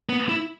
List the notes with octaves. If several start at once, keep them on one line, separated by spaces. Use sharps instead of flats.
B3
E4